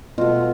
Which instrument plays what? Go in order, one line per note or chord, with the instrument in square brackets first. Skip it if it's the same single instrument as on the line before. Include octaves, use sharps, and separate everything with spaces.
[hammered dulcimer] B2 A3 F4